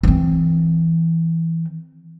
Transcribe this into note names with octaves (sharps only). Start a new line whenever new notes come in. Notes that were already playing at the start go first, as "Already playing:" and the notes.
E3 C4